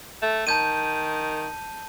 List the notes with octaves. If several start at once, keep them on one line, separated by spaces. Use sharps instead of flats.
A3
D#3 A5 G6 D#7